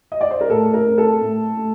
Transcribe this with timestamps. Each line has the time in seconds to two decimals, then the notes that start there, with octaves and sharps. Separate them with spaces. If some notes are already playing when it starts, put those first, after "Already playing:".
0.12 D#5
0.21 D5
0.31 C5
0.41 A#4
0.50 A2 A4
0.74 A#4
0.86 A3 C4
0.98 A4
1.21 A2
1.57 A3